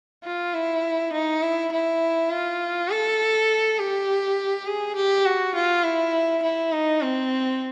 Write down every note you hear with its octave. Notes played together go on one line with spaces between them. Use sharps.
F4
E4
D#4
E4
E4
F4
A4
G4
G#4
G4
F#4
F4
E4
E4
D#4
C4